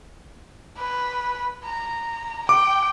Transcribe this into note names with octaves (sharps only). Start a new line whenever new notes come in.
B4
A#5
G5 D6